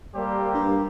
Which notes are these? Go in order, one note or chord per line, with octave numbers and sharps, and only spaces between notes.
G3 A#3 G4 A4 C5
G2